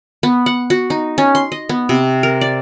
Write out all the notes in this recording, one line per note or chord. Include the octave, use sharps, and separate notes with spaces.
B3
F#5
F#4
D#4
C#4
C6
D#5
B3
C3
A#4
D5